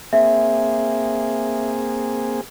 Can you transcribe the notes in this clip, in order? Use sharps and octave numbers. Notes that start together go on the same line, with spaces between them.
A#3 C4 G#4 E5